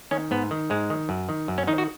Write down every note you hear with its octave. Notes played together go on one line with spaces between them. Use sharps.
D#3 C#4
G#2 B3
D#3
G#2 G#3
D#3
F#2
D#3
F#2
C#4
D#3 D#4
F#4